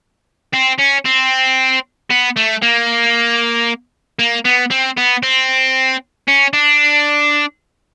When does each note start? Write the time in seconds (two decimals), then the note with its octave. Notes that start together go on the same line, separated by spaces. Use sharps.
0.54 C4
0.79 C#4
1.05 C4
2.10 B3
2.36 A3
2.62 A#3
4.19 A#3
4.45 B3
4.71 C4
4.97 B3
5.23 C4
6.28 C#4
6.53 D4